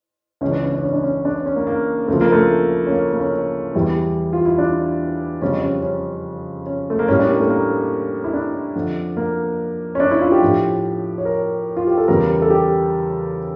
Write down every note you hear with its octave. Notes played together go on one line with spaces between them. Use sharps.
C#2 C#3 E3 C#4
D4
C#4
D4
C#4
D4
C#4
D4
C#4
C#4
A#3
A#3
D2 C#3 F3 A3
A#3
A3
C#4
A#3
A#3
C#4
C#4
E2 E3 G3 E4
F4
E4
D4
F2 C#3 G3 C#4
C#4
C#4
C#4
A3
A#3
A2 G3 C#4
D4
A#3
A3
A#3
E4
D4
F2 D3 F3
A#3
C#4
D4
E4
F4
G4
A2 F3
C#5
A#4
F4
G4
A4
E2 C#3 G3 A#4
A4
G4